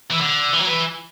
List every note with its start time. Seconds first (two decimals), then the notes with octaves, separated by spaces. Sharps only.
0.11 E3
0.21 D3
0.53 E3
0.59 F#3
0.67 E3